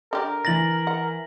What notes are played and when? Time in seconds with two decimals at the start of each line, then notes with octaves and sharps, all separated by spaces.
0.13 D3 G4 A#4 D5
0.45 E3 A6 A#6 F#7
0.87 F#5